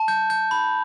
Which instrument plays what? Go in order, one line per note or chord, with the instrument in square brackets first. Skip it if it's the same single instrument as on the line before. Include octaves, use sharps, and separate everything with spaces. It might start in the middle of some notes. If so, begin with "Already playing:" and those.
Already playing: [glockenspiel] A5
G6
G6
B5